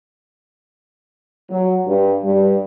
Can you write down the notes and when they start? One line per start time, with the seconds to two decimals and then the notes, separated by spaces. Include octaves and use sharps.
1.50 F#3
1.87 G2
2.24 G2